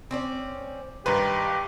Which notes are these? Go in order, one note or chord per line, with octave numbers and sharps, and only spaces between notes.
C4 C#4 D5
G2 D#3 F4 G4 B4